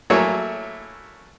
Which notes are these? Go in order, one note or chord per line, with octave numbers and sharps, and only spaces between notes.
F#3 A3 A#3 E4 G#4 C#5